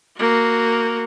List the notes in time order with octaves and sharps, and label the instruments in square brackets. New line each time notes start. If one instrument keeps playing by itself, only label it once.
[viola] A#3 F#4